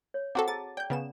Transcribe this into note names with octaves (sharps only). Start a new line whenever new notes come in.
C#5
C4 F#4 A4 F#5 A#5 D6
G#4 A5 A#5 A6
D5 G5 G6
C#3 B3 E7